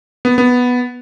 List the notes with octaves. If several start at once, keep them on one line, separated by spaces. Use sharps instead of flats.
B3
B3